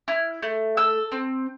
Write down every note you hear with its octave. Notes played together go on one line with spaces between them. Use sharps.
E4 F6
A3
A4 E6
C4